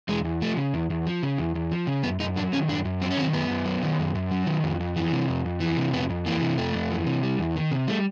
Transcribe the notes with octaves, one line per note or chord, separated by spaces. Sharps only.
E2 G#3
E2
F3 A3
C#3
E2
E2
F3
C#3
E2
E2
F3
C#3
F#2 B3
F#2 D#4
F#3 D4
D#3 C#4
F#2 D4
F#2
F#3 C4
C#4
D#3 C4
F#2 B3
F#2
F#3
D#3
F#2
F#2
F#3
D#3
F2
F2
E3
C3
F2
F2
E3
C3
F2 B3
F2
E3 A#3
C3
F2 A3
F2
E3
C3
G3
E2
D#3
C3
G3 A3